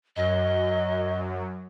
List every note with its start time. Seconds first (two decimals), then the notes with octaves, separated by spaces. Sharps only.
0.16 F#2 F#3 D#5